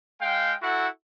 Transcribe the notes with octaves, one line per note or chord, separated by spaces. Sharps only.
G#3 F5 G5
E4 F#4 A4 F#5